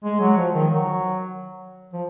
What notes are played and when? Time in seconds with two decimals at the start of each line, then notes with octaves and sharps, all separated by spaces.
0.04 G#3
0.21 F#3
0.37 F3
0.54 D#3
0.70 F#3
1.93 F3